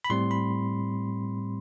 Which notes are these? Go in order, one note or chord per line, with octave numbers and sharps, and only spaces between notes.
B5
A2 G3 C4 C6
B5